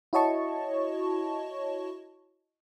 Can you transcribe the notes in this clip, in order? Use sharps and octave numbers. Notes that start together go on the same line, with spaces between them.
E4 F#4 C#5 D#5 A5 C#6